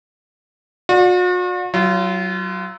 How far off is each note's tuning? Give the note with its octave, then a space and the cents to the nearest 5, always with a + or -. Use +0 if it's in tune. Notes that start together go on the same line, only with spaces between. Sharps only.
F#4 -45 D5 +0
F#3 +20 F4 -25